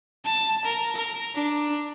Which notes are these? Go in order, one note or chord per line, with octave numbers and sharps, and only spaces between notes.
A5
A#4
A#4
D4